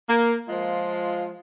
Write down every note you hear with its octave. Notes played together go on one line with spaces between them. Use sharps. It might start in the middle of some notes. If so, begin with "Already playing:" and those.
A#3
F3 G#3 F4